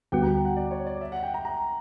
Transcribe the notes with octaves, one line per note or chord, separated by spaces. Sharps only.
D2 D3 G3 B3 F#4 G5
A#5
G5
F#5
D5
C#5
D5
E5
F#5
G5
A#5
A#5